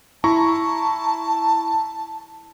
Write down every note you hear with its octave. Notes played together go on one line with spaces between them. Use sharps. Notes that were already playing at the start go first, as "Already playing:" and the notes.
E4 A5 A#5 C#6